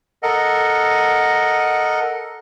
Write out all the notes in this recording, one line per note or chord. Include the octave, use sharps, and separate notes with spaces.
A4 A#4 D#5 F#5